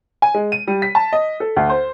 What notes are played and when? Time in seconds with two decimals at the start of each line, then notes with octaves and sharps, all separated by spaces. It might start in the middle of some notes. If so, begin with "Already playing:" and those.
0.22 G#5
0.35 G#3
0.52 D#7
0.68 G3
0.82 B6
0.95 A5
1.13 D#5
1.40 A4
1.57 D2
1.70 C5